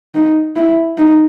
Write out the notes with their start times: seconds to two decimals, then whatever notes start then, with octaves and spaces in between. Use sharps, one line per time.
0.15 D#4
0.56 E4
0.98 D#4